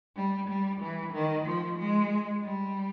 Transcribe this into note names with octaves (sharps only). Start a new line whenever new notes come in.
G3
G3
E3
D#3
F3
G#3
G3